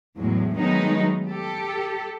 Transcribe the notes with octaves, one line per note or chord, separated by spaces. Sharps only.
E2 A2 F#3 G#3
D#3 F#3 G#3 A3 B3 D#4
G4 A4